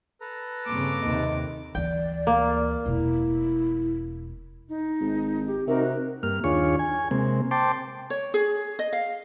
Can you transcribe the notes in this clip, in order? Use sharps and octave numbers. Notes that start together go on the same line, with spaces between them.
A4 B4 A#5
G2 C#3 A#3 C4 D6
D#2 C3 D#5
D2 E3 D5 G5
A#3
E1 B2 E4
D#4
G#1
G4
C3 D#4 F#4 A#4
F#6
G2 A#3 F6
D#2 D4 F4 G#4 C#5 C#6
G#5
C3 G#3 A#3 C4
C5 G5 A5 C6 D6
C#5
G#4
D#5
F5